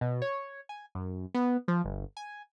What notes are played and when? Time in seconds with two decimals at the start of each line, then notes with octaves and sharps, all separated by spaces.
0.01 B2
0.22 C#5
0.69 G#5
0.95 F#2
1.34 B3
1.68 F3
1.84 G1
2.17 G#5